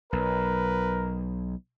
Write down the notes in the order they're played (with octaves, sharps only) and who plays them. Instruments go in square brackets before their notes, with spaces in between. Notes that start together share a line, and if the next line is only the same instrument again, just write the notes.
[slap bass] B1 [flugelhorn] A#4 [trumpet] B4